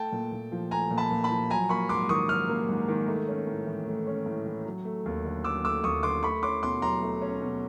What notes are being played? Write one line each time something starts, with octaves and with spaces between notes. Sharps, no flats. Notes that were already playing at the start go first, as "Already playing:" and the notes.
Already playing: A3 G5 A5
A#2
A#2
F3
A3 G#5 A#5
A#2
A5 B5
A#2
A5 B5
F3
F#3 G#5 A#5
A#3 B5 C#6
G#2 C6 D6
D#3 C#6 D#6
F#3 D#6 F6
A#3
G#2
D#3
A3
C#4
A2
E3
A3
C#4
A2
E3
F#3
A3
D#2
D3
F#3 D6 E6
A3 D6 E6
D#2 C#6 D#6
D3 C6 D6
A3 B5 C#6
C#4 C6 D6
B2 C6 D6
F#3 A#5 C6
A3
C#4
B2